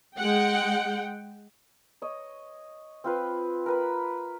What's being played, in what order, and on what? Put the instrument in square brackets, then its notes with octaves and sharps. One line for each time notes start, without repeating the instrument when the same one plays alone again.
[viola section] G#3 F#5 G5
[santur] C#5 D#5
C4 F4 B4
A#4 B4 B5